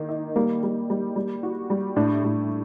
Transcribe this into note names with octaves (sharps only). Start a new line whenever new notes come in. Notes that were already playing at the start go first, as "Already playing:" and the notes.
Already playing: D#3 A#3
D#4
G3 A#3
G3
G3
G3
F#4
G3
A2 D4
A2